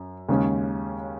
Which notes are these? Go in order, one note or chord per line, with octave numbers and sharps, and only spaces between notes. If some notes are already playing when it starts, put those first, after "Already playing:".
Already playing: F#2
D#2 C#3 G#3 C#4